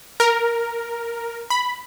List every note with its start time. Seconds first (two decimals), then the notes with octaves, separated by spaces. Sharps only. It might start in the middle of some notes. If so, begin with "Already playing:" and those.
0.20 A#4
1.50 B5